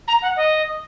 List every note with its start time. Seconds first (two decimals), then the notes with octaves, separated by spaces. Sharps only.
0.08 A#5
0.22 F#5
0.36 D#5